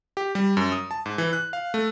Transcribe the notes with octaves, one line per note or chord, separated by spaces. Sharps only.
G4
G3
F#2
D#6
A5
G#2
E3
F#6
F5
A3